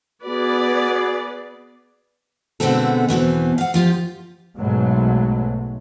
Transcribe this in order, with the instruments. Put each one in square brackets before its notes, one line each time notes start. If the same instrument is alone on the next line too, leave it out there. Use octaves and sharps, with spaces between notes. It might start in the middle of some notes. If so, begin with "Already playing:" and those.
[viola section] B3 B4 D5 [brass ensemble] F#4 G#4
[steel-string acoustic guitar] B2 D3 G#3 B3 C4 A4
E2 B2 E3 C4
F5 F#5
F3 F4 G4
[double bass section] B1 G#2 B2 F#3 G#3 A3